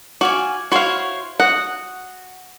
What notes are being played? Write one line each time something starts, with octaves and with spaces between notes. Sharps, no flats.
F#4 D5 F5 G#5
E4 F#4 C5 C#5 F5
F#4 F#5 D#6